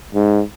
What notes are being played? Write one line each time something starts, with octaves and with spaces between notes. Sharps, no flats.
G#2